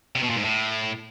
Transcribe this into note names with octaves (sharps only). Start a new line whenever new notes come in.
C3
B2
A#2
G#2
A2